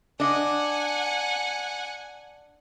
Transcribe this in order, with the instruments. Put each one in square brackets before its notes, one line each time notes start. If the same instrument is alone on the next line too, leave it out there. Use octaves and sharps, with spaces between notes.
[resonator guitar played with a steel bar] D4 D#5 [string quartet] F#5 G#5